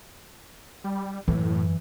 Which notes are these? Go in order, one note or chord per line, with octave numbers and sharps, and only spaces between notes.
G3
F#2 A2 E3